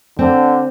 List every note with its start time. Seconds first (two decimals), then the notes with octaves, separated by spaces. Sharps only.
0.19 D3 C4